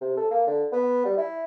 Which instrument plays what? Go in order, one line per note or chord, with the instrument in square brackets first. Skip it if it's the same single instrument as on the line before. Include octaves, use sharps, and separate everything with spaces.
[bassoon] C3
A4
A#3
D3
B3
G3
E4